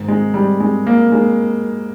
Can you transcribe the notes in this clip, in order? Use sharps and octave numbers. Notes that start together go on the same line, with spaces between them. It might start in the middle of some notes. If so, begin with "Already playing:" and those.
Already playing: G#2 D#3
G#3
G3
G#3
A#3
G#3